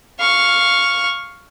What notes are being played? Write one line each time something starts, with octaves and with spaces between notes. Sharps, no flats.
F5 C#6